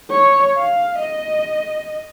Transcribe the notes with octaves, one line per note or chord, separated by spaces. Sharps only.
C#5
F5
D#5